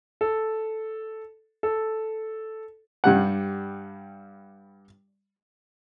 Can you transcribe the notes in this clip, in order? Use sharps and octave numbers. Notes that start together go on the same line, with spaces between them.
A4
A4
G2 G3 F#5